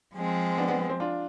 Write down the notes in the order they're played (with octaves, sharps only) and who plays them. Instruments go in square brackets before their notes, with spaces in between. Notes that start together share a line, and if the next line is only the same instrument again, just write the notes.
[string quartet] F3 G#3 C4
[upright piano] B3 D4
B3 D4
B3
C4
D4 F4